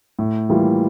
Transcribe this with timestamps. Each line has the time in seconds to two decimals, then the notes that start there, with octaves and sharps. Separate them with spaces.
0.19 A2
0.49 E3 G3 A#3 F4